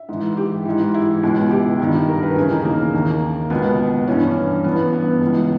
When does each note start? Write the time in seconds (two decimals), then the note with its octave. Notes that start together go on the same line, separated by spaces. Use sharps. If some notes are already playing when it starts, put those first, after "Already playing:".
Already playing: E5
0.09 G#2 E3
0.37 G4
0.65 G#2 E3
0.94 E4
1.23 C#2 B2
1.51 G4
1.80 G2 D#3
2.09 A#4
2.23 B4
2.36 D#2 C#3 E3 G#4
2.51 D#4
2.65 A#3
2.94 D#2 D#3
3.50 C#2 B2 B3
4.08 G2 E3 C#4
4.64 G2 E3 B3
4.93 B3
5.21 C#2 C#3 E3